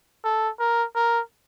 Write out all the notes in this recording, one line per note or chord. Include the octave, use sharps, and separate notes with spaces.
A4
A#4
A#4